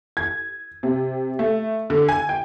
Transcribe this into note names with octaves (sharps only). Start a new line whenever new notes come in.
G#6
C3
A3
D3
G#5
G5